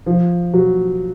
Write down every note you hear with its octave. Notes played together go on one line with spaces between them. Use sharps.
F3
F#3